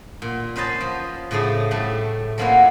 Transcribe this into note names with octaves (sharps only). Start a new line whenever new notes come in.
A#2
C#4 B4 C5 D#5 A5
F3
A2 C#3 G#3 A3 D#4
A2 G3 A3
F3 F#3 A#3 C#4 E4 F#4